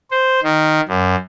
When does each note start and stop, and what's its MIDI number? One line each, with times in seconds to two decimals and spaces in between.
0.11 0.40 72
0.43 0.80 51
0.88 1.16 42